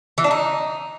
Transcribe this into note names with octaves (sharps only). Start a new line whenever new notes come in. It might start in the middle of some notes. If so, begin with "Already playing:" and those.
E3
D4
D#4